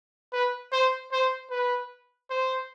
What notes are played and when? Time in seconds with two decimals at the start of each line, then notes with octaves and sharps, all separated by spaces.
0.33 B4
0.73 C5
1.12 C5
1.51 B4
2.30 C5